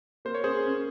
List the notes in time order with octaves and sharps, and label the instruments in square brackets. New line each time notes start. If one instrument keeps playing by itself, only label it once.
[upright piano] A#3 [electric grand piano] C5
[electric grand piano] C#5
[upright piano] C#4 [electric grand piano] G#4 C5
[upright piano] C#4